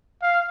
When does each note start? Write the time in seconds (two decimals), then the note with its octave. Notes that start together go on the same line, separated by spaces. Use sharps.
0.23 F5